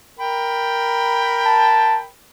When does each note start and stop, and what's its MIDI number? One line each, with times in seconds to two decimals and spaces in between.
0.20 2.07 70
0.20 2.07 79
0.20 2.07 83
1.45 1.99 81